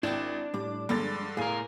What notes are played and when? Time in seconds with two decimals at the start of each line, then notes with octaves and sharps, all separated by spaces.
0.03 G#1 D4 E4 G5 E7
0.54 A2 G3 D6
0.89 G2 D3 F3 G#3 A#5 A6
1.37 A2 G#4 A#4 F5 G#5